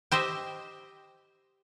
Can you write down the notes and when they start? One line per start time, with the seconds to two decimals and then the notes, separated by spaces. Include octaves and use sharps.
0.12 G4 C5 D#5 E5